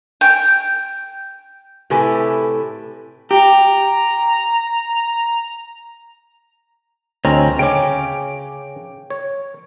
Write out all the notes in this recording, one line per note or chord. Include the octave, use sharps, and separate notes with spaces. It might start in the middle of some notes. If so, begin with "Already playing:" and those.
G5
A2 C3 G4 A4 B4 G#5
G4 A#5
D2 C4 C#4 C#5 D#5 A#5
C#3 C#4 G5 D6
C#5